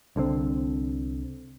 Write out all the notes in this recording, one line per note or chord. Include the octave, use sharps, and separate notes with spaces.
C2 D3 G3 C4